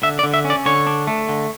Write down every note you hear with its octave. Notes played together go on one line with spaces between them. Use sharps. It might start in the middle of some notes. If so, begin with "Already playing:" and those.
D3 E5
D5
D3
E5
C#4
D5
D3 C#5
D4
A3
D3